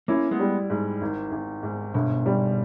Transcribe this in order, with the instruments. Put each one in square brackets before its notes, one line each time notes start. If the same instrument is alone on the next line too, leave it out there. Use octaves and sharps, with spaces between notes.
[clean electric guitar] A#3 C#4 [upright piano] E4
[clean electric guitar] G#3 B3
[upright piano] G3
G#2
G#1
G#1
G#2
[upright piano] G1 [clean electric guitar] B2
[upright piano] G3